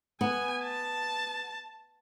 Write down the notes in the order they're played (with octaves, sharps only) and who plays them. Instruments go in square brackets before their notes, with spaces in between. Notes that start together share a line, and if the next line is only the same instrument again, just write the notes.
[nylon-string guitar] B3 [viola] G#5
[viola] A5